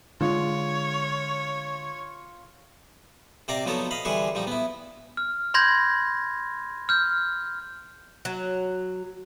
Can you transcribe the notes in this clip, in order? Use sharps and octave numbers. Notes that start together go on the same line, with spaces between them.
D3 G#3 F4 C#5
C3 C4 A#4 D5 F5 A#5
F3 F#3 B3 D#4 A4 C#5
D#5 F5 B5
D3 E3 G3 G#4 B4 C#6
F3 G3 D#4
B3 E4
F6
B5 C6 G6 G#6 A#6
F6 G6
F#3